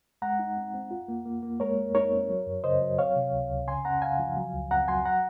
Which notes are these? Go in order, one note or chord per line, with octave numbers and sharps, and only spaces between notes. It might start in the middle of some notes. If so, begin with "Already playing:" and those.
G#3 F#5 A#5
D#4
C4
C4
F4
A#3
A#3
A#3
G#3 A#4 C#5
G#3
D#4 A#4 C#5
C4
F#3
F#2
C#3 C5 D#5
F#3
C4 C#5 F5
C3
C#2
C#2
C#3 G#5 C6
C#4 F#5 A#5
C#3 F5 G#5
F3
F#3
C#2
C4 F#5 A#5
F#3 G#5 C6
F#5 A#5